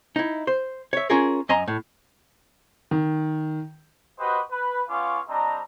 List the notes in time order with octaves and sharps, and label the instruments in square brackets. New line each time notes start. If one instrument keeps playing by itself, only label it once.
[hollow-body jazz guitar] D#4 E4
C5
C#5 E5
C#4 F4 G#4 A#4
F#2 D#5 G#5 A#5 C6
A2
[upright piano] D#3
[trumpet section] F#4 G4 B4 C5 D#5
B4
B3 C#4 F4 F5 C#6 D6
G3 C4 D4 D#5 A#5